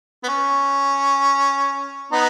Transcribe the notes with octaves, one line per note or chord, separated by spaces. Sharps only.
B3
C#4
B3 D#4